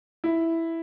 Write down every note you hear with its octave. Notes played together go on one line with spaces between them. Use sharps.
E4